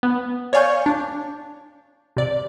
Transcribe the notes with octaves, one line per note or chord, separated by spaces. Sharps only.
B3
C#5 D5 F5 G#5 C#6 G6
D4
C3 D5